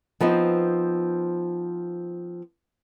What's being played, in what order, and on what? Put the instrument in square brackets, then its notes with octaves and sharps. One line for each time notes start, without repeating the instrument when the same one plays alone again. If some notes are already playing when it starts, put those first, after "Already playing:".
[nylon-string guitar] F3 B3 C4 D#4